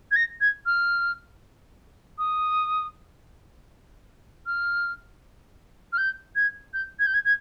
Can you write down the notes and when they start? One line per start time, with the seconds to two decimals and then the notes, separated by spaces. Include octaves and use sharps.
0.11 G#6
0.16 A#6
0.41 G#6
0.66 F6
2.18 D#6
4.46 F6
5.93 F6
5.98 G6
6.35 G#6
6.73 G6
6.99 G#6
7.06 G6
7.14 G#6
7.25 G#6